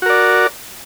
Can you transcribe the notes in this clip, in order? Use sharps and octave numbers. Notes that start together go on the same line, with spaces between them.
F#4 A#4 D5